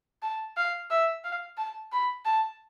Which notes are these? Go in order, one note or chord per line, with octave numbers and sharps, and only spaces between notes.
A5
F5
E5
F5
A5
B5
A5